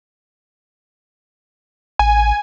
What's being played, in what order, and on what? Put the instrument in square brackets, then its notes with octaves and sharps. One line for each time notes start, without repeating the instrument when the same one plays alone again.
[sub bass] A1 [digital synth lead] G#5